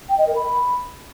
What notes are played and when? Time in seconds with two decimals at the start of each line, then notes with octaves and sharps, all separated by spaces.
0.09 G5
0.18 D#5
0.27 A#4
0.36 B5